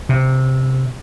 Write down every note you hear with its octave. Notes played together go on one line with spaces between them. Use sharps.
C3